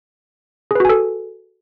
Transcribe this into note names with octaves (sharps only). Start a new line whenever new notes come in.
F#4 G#4 A4 B4 G#5